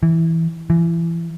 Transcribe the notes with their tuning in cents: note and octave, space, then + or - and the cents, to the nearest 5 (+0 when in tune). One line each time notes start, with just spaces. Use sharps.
E3 -5
E3 +30